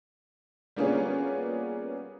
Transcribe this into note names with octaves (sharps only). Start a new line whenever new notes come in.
G3 A#3 B3 C#4 F4 G#4